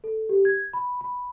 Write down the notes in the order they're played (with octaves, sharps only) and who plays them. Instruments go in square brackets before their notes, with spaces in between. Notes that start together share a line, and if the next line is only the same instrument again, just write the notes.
[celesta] A4
G4
G#6
B5
B5